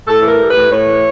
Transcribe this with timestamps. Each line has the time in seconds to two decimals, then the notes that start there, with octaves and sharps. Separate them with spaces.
0.07 A2 A4
0.23 E3
0.28 A#4
0.39 G3
0.49 B4
0.56 A2
0.71 A2 C#5
0.87 E3